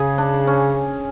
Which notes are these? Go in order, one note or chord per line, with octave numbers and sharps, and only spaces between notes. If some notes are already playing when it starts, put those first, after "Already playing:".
Already playing: C#3 G#4
D4
C#4